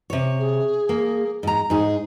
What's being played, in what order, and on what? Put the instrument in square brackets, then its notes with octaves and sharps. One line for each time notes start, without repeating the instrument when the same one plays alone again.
[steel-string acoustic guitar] C3 C#5
[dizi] G#4
[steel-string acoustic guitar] A#3
G#2 A#5
[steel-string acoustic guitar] G#2 G#4 [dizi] D#4